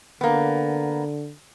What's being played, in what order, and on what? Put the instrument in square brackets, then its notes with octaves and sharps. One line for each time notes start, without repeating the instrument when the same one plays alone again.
[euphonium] D3 [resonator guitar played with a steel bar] A#3 B3